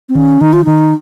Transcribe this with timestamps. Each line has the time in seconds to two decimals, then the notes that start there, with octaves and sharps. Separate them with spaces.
0.09 C4
0.15 D#3 C#4
0.41 D#3 D#4
0.53 F4
0.65 D#3 D#4